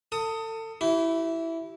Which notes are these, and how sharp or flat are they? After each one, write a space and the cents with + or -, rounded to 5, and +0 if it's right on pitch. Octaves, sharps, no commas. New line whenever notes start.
A4 +30 D#6 +10
E4 +0 G4 -40